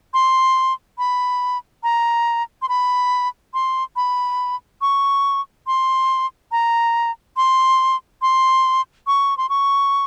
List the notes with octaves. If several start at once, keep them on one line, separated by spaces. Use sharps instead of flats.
C6
B5
A#5
C6
B5
C6
B5
C#6
C6
A#5
C6
C6
C#6
C6
C#6